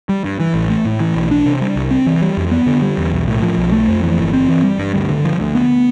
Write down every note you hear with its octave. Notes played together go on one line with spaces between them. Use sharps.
G3
G2
E3
A1
A3
A2
E3
B1
D4
C3
G3
C2
C4
E3
G3
F2
B3
D3
G3
E2
B1
A2
F3
B1
A3
F2
E3
G1
C4
E3
G3
G2
D2
D3
F3
D2
B3